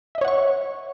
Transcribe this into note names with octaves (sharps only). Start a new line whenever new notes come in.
C#5 D#5 E5 F#5 C#6